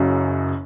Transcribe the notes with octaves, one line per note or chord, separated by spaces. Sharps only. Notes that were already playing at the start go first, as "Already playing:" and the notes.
Already playing: F#1 F#2 C#3 F#3